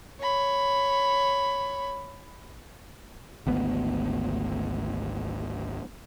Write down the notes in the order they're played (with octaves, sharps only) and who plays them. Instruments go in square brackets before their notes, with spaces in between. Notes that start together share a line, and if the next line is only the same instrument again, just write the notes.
[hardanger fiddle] C#5 B5
[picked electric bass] G#1 D2 B3